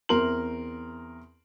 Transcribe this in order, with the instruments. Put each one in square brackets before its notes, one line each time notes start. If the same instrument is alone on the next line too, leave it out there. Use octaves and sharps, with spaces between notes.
[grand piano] E2 C4 A#4 A#5 C6 F#7